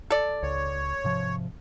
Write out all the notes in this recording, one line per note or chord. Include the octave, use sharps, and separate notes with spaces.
A4 D5
C#2 C#5
G#2 C3 F3